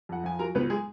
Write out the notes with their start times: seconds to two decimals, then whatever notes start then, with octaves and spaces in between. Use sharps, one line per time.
0.09 F2 F#5
0.24 F3 G#5
0.39 F#3 A#4 A#5
0.55 C#2 B3 B4
0.70 G#3 G#4